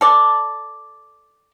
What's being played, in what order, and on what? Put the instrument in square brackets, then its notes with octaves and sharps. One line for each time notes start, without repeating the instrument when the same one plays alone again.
[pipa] A4 D5